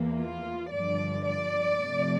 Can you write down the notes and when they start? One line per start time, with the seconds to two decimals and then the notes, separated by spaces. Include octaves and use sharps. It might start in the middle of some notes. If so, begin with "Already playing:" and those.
Already playing: E2 E3 A#3
0.17 F4
0.72 G2 D3 F3 D5
1.26 D5
1.81 C3 F3 A3